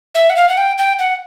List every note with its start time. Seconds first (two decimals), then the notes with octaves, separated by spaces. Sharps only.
0.15 E5
0.30 F#5
0.36 F5
0.49 F#5
0.57 G5
0.78 G5
0.99 F#5